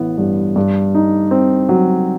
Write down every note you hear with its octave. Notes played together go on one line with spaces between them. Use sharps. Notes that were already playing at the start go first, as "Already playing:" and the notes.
Already playing: A1 E3 B3
G2
G2
D#4
C4
F#3